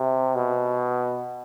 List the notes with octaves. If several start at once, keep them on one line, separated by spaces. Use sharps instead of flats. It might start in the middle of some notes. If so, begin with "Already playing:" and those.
Already playing: C3
B2